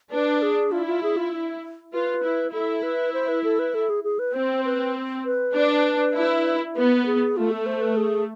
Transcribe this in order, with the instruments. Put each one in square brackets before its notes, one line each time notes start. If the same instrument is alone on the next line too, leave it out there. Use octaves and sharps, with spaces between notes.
[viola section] D4 [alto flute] B4
[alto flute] G#4
[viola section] E4 [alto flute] F4
[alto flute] F4
G#4
F4
[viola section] F4 [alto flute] B4
[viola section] E4
[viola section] E4 [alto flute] A4
[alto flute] B4
C5
B4
A4
B4
A4
G#4
G#4
B4
[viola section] C4 [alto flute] C5
[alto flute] B4
B4
[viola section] D4
E4
[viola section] B3 [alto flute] B4
[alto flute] G#4
[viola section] A3 [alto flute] F4
[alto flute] A4
C5
B4
G#4